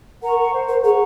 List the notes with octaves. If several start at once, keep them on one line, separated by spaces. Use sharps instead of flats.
A#4 F#5 A#5 C#6
C5
A#4
G#4 F#5 A#5 C#6